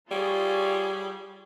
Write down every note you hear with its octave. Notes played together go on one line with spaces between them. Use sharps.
G3 F4 G#4 C#5